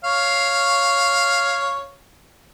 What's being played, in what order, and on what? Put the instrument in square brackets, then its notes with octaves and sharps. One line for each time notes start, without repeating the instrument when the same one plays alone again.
[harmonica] C#5 F5